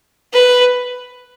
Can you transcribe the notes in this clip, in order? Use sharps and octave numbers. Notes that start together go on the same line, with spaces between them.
B4